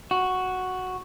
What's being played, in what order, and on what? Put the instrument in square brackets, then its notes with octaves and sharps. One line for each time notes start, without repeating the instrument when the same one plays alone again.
[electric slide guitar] F#4